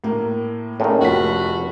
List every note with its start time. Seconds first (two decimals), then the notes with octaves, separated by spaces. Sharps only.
0.04 A2 A#3
0.80 A2 D#3 A#3 C#4 G#4
1.01 F1 F4 F#4 B6